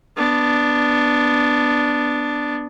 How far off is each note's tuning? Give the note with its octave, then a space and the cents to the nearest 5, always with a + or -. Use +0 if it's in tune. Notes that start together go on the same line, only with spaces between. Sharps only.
B3 +0 D4 +0